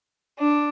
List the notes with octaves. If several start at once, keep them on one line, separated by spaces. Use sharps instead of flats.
D4